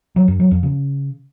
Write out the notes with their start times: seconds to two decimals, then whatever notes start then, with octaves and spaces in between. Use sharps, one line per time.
0.16 F#3
0.28 F#2
0.40 F#3
0.51 F2
0.63 C#3